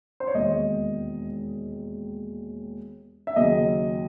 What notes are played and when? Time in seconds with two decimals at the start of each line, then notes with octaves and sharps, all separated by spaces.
0.20 C5
0.27 C#5
0.34 E1 D#2 D#3 G#3 D#5
3.27 E5
3.36 D#2 C#3 F#3 D#5